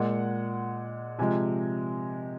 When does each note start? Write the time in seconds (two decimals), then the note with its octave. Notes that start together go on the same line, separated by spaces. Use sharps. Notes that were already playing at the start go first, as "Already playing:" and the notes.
Already playing: A#2 G#3 F#5
1.19 C3 F3 G#3 G#5